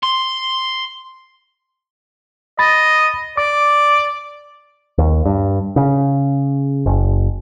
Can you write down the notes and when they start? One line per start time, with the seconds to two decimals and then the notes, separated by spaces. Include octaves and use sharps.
0.03 C6
2.59 D#5 B5 A6
3.37 D5 D6
4.98 D#2
5.26 G2
5.76 C#3
6.86 F#1